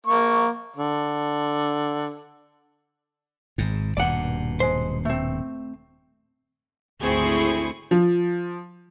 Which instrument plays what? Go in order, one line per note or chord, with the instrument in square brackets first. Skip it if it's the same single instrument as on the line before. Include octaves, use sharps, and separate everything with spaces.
[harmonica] A#3 C#6
D3
[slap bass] G#1 G#2
[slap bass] D#1 G2 B2 [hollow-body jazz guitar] D5 F#5
[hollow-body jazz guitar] G#3 C5
A3 C4
[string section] G#1 D2 C4 E4 G#4 C#6
[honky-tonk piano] F3